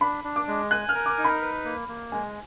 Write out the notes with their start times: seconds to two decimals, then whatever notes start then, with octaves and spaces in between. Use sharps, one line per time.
0.01 D4 B5
0.24 D4
0.36 D6
0.48 G#3
0.71 G#5 F#6
0.89 F6
0.95 A#4
1.06 D6
1.18 D#4
1.24 B5
1.42 B4
1.65 A#3
1.89 A#3
2.12 G#3 G#5